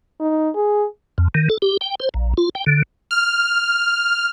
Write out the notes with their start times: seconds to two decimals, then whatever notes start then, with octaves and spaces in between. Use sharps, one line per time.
0.20 D#4
0.55 G#4
1.18 F2
1.34 D#3
1.50 A4
1.62 G4
1.81 G5
2.00 C5
2.14 A#1
2.37 F4
2.55 G5
2.66 D3
3.11 F6